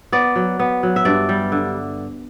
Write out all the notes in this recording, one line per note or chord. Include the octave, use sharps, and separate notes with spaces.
B3 D5
F#3
B3
F#3
E5
G2 D5
G3
D3